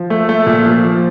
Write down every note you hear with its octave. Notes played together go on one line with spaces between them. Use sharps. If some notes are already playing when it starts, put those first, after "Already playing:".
Already playing: F3
A3
A3
A#2
F3
F3